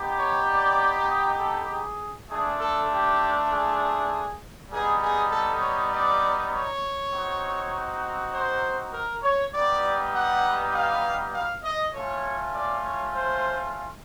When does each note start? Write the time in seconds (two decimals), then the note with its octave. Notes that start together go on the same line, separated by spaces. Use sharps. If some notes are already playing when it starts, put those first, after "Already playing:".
Already playing: B3 D#4 G4
0.18 C#5
0.48 D5
1.08 D#5
1.39 A4
1.68 G#4
2.29 A3 D4 F4 G#4
2.60 A4
2.90 G4
3.50 G#4
4.70 G3 B3 D#4 G#4
5.01 G#4
5.31 A4
5.60 C#5
5.90 D5
6.51 C#5
7.11 C4 D#4 F#4
8.32 C5
8.93 A#4
9.22 C#5
9.53 G3 B3 D#4 G4 D5
10.14 F#5
10.73 F5
11.34 F5
11.64 D#5
11.94 A3 C#4 F4 C#5
12.54 D5
12.84 C#5
13.14 C5